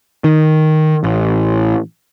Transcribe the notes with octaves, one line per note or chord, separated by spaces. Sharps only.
D#3
A1